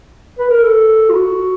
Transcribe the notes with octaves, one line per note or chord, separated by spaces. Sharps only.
B4
A#4
A4
F4
F#4